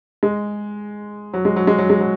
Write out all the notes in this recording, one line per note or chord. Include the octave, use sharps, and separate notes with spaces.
G#3
F#3
G#3
F#3
G#3
F#3
G#3
F#3